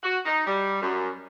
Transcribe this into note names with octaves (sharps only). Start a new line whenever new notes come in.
F#4
D#4
G3
F#2